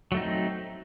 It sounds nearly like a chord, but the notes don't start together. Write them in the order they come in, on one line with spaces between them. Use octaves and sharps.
F#3 A3 D#4 C4